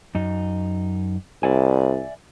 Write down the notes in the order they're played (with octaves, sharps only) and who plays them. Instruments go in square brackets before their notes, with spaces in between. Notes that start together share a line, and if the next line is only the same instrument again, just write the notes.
[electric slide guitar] F#2 D#4
[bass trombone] C2 [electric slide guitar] D5 E5 G#5